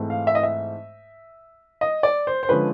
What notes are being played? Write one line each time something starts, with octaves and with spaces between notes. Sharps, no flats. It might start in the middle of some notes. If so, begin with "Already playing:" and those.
Already playing: G#2 E3 A3 C4
F5
E5
D#5
E5
D#5
D5
C5
C5
D3 F3 G#3 C#4 B4